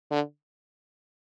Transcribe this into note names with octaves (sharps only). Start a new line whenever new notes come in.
D3